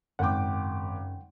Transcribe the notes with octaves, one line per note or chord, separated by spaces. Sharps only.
G#1 F#2 C#3 F#5 G5 D6